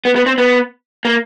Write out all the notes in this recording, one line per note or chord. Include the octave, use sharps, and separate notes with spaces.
B3
B3
C4
B3
A#3